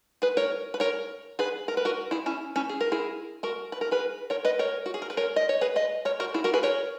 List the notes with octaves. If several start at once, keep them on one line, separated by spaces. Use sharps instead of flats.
G#4 B4
A#4 C#5
B4
A#4 C#5
G#4 B4
A#4
B4
F#4 A#4
E4 G#4
C#4 E4
C#4 E4
G#4
A#4
E4 G#4
F#4 A#4
B4
A#4
G#4 B4
A#4 C#5
B4 D#5
A#4 C#5
F#4
G#4
A#4
B4
A#4 C#5
D#5
C#5
G#4 B4
B4 D#5
A#4 C#5
F#4 A#4
E4 G#4
F#4 A#4
G#4 B4
A#4 C#5